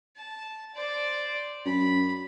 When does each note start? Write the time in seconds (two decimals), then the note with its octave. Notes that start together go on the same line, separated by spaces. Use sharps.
0.16 A5
0.74 C5 D5
1.65 F#2 B5